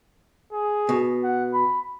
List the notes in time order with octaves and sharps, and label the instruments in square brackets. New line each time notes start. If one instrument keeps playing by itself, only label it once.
[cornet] G#4
[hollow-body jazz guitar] B2
[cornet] F#5
B5